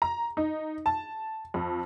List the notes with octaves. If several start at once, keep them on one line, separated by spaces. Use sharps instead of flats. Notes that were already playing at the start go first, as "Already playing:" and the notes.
A#5
D#4
A5
F2